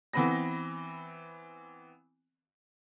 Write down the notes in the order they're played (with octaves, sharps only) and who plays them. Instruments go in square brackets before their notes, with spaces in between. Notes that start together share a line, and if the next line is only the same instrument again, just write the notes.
[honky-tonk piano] E3 B3 C4 B5 A#6